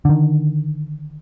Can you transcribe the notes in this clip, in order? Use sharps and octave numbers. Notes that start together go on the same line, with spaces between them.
D3 D#3